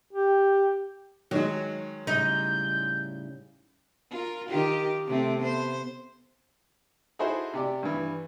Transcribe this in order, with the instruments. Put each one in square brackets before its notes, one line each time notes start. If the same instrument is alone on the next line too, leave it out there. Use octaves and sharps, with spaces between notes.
[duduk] G4
[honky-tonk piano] D#3 G#3 [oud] F#3
[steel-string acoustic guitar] A2 C#3 G3 [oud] D#4 [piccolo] G6
[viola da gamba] F4 A#4
D#3 F4 G4
C3 A3 C4
B3 C5
[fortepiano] D#4 E4 F#4 G#4 A4 C5
C3 G4 D5
G2 E3